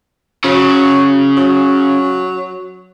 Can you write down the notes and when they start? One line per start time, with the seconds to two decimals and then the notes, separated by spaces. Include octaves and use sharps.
0.44 C#3 F#3
1.37 F#3